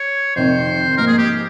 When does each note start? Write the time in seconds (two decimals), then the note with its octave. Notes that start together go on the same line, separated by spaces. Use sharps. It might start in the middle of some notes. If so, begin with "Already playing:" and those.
Already playing: C#5
0.36 F2 C3 D#3 C5
0.97 G#2 F3 A#3 A#4
1.07 G#4
1.18 G4